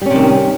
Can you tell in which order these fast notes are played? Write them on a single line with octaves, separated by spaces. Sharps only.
G3 C#4 C3 D#3